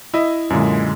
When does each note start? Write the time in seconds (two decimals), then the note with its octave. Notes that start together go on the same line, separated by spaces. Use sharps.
0.14 E4 D#5
0.50 F#2 A#2 D3 G#3